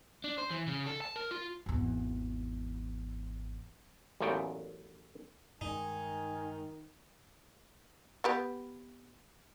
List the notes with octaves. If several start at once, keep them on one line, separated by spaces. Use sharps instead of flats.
D4
C5
E3
C#3
A4
A5
A#4
F4
G#1 E2
A1 F#2 A#2 A3 B3 G5
G2 D#3 G#3 D#4 G#5
B3 G4 B4